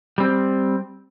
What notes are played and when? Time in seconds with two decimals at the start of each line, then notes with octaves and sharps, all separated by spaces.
0.18 G3 C4